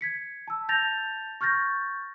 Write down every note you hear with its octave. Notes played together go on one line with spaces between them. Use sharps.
G#6 B6 C#7
A5 E6
A5 G6 A6 A#6 F7
C#6 F6 G6 A6 A#6